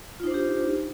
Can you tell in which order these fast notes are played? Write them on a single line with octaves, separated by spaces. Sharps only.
F4 D#4 C5 D4 G4